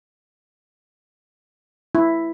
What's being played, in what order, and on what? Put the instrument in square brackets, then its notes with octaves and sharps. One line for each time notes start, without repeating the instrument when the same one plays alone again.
[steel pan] E4